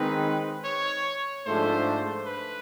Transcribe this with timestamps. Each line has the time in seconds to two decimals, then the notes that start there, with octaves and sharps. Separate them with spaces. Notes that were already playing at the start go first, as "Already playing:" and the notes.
Already playing: D#3 G#3 C4 D#4 B4
0.65 C#5
1.45 G#2 F3 A3 D4 C5
2.26 B4